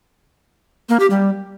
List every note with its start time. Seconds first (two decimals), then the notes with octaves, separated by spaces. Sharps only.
0.89 A#3
1.00 G4
1.10 G3